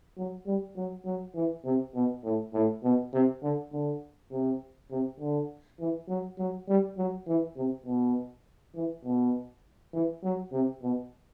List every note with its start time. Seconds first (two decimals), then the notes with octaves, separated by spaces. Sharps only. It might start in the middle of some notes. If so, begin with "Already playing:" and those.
0.18 F#3
0.47 G3
0.76 F#3
1.06 F#3
1.36 E3
1.65 C3
1.95 B2
2.24 A2
2.54 A2
2.84 B2
3.13 C3
3.43 D3
3.73 D3
4.31 C3
4.91 C3
5.20 D3
5.80 E3
6.09 F#3
6.39 F#3
6.68 G3
6.98 F#3
7.27 E3
7.57 C3
7.86 B2
8.75 E3
9.05 B2
9.94 E3
10.23 F#3
10.52 C3
10.82 B2